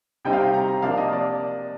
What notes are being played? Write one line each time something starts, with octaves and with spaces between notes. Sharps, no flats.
C3 G3 C4 D#4 G5
F5
G5
A#5
A#5
C3 F3 A#3 D4 F5
D#5
D5